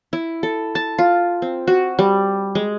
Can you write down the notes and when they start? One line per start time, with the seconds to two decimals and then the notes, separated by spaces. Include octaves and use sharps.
0.13 E4
0.43 A4
0.75 A5
0.98 F4
1.42 C4
1.67 F#4
1.99 G3
2.55 G#3